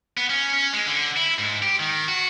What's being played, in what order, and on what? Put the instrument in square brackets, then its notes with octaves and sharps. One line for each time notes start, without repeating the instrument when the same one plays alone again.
[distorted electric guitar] B3
C#4
C#4
G#3
D3
E4
G#2
G4
D#3
F#4